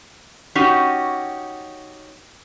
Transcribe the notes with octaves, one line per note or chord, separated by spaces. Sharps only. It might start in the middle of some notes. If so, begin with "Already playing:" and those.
C#4 D#4 F#4 G4